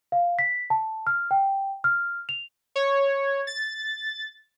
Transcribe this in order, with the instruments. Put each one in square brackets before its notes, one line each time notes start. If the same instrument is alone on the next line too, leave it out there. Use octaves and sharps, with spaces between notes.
[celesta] F5
B6
A5
F6
G5
F6
F7
[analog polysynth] C#5
A6